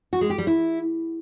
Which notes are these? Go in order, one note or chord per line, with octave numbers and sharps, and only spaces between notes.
F#4
G#3
G4
G3
E4